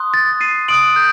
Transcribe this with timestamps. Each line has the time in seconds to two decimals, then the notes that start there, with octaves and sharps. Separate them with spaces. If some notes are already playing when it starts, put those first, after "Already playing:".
Already playing: C6 D#6 F#6
0.14 A6
0.41 C7 D#7
0.68 C6 D#6 F#6 D7 F#7
0.96 G6